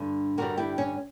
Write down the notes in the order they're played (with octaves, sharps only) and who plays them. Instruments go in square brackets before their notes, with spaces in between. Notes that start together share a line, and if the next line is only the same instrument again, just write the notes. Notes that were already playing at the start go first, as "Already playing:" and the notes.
Already playing: [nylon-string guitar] G2 D3 G3
G2 D3 G3 F#4 A#4
E4 G4
C#4